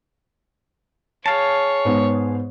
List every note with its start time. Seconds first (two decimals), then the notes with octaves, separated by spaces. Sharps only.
1.26 G#4 C#5 F5 A5
1.85 G#2 B3